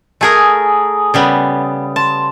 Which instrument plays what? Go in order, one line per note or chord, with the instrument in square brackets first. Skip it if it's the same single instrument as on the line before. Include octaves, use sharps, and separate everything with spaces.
[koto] A3 G#4 A#4 [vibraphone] G#5 D#6
[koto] C#3 G3 B3
[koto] A5 [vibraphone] C6